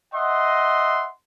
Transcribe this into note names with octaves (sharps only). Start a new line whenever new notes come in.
D#5 E5 F#5 C6